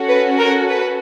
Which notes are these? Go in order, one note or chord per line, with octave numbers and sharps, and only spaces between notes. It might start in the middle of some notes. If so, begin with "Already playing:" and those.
Already playing: C#4 F#4 A4
B4
A#4
B4